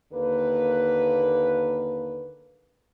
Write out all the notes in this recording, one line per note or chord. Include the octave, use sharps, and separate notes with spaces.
D#2 D3 A#3 B4